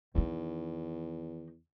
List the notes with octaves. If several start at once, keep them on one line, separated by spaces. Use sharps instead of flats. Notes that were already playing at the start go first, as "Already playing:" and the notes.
E2 D#3 D#4